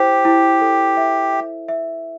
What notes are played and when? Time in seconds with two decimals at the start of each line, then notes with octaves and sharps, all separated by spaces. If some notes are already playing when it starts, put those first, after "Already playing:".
Already playing: E4 G4 C5
0.25 E4
0.61 A4
0.97 E5
1.33 E5
1.68 E5